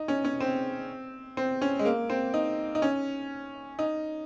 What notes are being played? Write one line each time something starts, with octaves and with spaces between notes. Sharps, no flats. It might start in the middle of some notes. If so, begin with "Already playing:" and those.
Already playing: D#4
C#4
C#4
C4
C4
C#4
G#3
A#3
C4
D#4
D#4
C#4
D#4